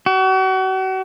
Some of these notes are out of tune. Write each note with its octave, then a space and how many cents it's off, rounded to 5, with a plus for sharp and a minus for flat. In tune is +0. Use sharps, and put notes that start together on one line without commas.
F#4 +40